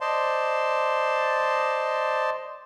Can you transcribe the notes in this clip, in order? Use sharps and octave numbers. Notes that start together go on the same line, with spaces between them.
C5 D5 D#5 A5 C6